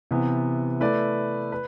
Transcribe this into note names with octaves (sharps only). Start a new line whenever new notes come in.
C3 E3 B3
A3 E4 B4 D5
B4